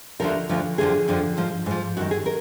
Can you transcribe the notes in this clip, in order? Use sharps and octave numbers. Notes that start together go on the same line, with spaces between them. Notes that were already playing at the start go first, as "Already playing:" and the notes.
D2 D3 F3 A#4
D2 D3 F3
F2 D3 F3 G#4
F2 D3 F3
G#2 F3
G#2 F3
F#2 D#3 F#4
G#4
A#4